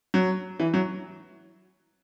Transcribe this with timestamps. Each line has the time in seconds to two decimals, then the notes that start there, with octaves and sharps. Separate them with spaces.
0.14 F#3
0.59 E3
0.74 F#3